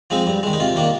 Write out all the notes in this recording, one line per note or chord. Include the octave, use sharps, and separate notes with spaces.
F3 G#3 C4 D#4
G2
D#3 G#3
D#4
C3 F4
D#3 A#3 D4